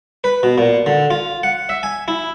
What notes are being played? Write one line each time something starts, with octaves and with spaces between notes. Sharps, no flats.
B4
B2
A#2
D3
F4
F#5
E5
G#5
E4